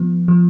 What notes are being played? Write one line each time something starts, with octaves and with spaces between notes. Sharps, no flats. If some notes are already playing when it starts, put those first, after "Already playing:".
Already playing: F3 B3
F3